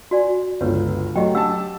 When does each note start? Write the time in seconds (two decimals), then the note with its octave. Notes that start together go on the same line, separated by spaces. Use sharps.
0.11 F#4 D5 G#5
0.61 G1 C#2 B4 C#5
1.15 F#3 A3 F#4 G4 D#5 G5
1.35 D4 G4 F#5 A5 E6